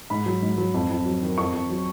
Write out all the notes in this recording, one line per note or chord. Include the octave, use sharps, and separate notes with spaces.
G#2 B5
F#3
G#2
F#3
F2
F2
F#3
D#3
F2 C#6
F2
F#3